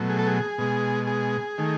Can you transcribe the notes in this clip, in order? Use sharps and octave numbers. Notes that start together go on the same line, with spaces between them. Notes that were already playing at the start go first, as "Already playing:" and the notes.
Already playing: B2 F#3 A3
G#4
A4
G#4
B2 G#3
G#4
D#3 A3